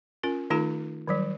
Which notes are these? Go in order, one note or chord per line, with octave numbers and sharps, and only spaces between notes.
C#4 F4 A#4
D#3 A3 D#4 F4 A4 A#5
D#3 F#3 G3